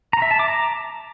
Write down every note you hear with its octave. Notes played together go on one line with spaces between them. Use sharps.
A#5
E5
A5
D6
A#5